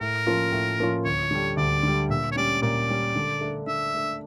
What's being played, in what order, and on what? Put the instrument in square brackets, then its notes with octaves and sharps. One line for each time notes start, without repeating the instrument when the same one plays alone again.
[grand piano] A2 [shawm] A#4
[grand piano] F3 A#3 C#4 F4
A2
F3 A#3 C#4 F4
[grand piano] D2 [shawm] C#5
[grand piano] D3 G3
[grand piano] D2 [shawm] D5
[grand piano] D3 G3
[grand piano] A#2 [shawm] E5
[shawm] C#5
[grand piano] G3 C#4 [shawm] D5
[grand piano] A#2 [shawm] D5
[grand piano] G3 C#4
D3
A3 D4
[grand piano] D3 [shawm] E5
[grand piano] A3 D4